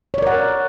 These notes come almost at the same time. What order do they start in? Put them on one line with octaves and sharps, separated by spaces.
C#5 D5 A#4 F#5